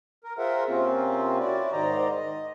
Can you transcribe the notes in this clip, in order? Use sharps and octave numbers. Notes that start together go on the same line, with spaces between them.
A#4
F4 G#4 A#4 C5 E5 F#5
C3 A#3 C4 C#4 F4
C#4 E4 F#4 D5
G#2 D#3 C5 D5 D#5 A#5
D#5